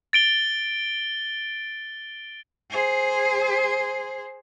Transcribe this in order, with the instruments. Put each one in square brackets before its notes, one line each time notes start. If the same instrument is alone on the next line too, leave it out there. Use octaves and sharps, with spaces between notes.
[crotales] A6 D7 G7
[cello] G#4 C5